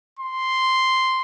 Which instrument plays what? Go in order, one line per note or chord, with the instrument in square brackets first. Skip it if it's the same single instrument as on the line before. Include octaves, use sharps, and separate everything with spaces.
[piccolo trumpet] C6